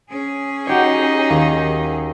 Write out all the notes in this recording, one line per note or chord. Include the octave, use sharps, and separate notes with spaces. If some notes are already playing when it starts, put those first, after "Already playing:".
C#4 G#4
D#4 F#4 G4 C#5
D#2